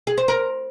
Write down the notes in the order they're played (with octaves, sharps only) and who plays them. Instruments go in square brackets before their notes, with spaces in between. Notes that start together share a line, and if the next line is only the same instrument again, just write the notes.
[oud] G#4
C5
A#4